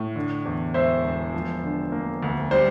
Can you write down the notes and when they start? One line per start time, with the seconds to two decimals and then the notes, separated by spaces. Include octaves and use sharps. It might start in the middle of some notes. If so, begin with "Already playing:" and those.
Already playing: A2
0.16 D3
0.45 E2
0.74 E1 C5 E5
1.04 E1
1.34 F3
1.63 D3
1.92 A#3
2.23 D2
2.51 G3 C5